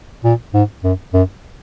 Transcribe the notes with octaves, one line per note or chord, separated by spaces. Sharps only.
A#2
G#2
F#2
F#2